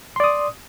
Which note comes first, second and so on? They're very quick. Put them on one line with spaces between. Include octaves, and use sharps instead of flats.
C6 D5 D#6